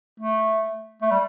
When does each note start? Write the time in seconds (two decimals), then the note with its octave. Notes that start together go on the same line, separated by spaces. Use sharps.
0.20 A3
1.02 A3
1.11 G3